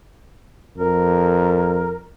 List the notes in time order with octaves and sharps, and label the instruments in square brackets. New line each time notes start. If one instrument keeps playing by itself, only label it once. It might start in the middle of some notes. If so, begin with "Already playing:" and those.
[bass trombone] F2 [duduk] A#4